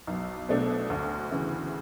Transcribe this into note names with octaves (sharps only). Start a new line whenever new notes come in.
B1
B2 A3 D4
D2
C#3 E3